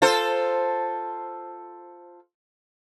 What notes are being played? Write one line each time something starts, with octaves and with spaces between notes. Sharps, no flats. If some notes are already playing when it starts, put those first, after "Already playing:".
F4 A4 C5